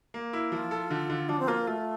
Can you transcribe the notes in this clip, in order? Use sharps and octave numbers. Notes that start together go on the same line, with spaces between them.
A#3
E4
F3 F4
A4
D3
D3
F3 D4
C4
A#3 F4
A3 F4